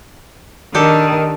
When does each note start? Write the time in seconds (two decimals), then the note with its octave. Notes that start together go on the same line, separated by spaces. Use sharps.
0.75 D#3 D4 G4 A4